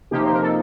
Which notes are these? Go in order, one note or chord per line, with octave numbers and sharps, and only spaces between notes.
C3 F3 A#3 D#4 G4
C5
A#4
A4